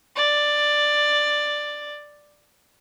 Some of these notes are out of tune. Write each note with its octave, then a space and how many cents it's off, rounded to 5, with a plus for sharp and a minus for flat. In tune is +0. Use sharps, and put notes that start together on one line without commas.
D5 +10